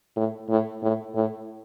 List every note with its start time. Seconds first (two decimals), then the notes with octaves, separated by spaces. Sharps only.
0.16 A2
0.49 A2
0.83 A2
1.15 A2